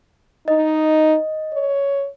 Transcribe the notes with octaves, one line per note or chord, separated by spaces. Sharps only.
D#4 D#5
C#5